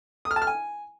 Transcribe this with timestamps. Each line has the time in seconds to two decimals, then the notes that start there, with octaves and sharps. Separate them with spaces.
0.25 D#6
0.31 F6
0.36 A5
0.42 F6
0.47 G#5